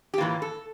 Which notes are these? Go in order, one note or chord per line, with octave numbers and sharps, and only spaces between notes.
G4
A2 E3 A#3 F4
A4